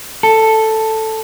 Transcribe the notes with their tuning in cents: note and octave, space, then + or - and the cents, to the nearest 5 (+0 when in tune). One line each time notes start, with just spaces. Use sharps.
A4 +5